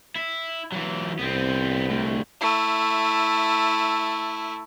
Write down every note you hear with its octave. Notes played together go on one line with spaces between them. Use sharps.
E4
E3 F#3
C2 B3 C4
D2 A2
A3 E4